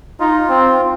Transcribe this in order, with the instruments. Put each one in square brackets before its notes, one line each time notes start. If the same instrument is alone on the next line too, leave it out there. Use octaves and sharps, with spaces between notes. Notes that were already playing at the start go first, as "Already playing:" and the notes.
[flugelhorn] D#4 [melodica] F4
[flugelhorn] C4